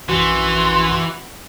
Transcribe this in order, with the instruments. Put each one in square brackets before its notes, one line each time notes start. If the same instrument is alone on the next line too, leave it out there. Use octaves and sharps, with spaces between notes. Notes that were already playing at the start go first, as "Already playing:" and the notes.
[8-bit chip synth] A#1 F#2 [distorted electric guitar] E3 [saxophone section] F#4 [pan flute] C6